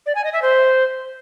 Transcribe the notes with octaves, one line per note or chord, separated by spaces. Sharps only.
D5
G#5
D#5
E5
C5